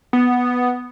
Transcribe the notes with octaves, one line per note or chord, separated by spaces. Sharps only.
B3